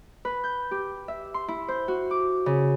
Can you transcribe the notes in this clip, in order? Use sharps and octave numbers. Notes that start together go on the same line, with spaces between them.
B4
G6
G4
E5
C6
E4
C5
F#4
D6
C#3